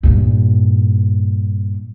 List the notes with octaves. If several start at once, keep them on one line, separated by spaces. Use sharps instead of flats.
G2 A#2